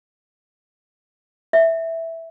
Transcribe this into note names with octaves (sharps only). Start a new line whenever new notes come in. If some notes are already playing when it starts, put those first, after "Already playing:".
E5